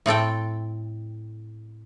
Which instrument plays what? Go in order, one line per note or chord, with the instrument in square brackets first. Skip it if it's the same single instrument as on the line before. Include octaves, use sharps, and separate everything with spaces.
[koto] A2 C4 A4 G5